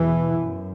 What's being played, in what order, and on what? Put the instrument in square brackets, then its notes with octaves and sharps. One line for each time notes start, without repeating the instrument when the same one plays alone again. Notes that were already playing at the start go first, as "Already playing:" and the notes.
Already playing: [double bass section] E2 B2 E3
F#2